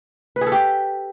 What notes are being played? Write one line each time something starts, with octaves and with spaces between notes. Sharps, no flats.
B4
G#4
A4
G4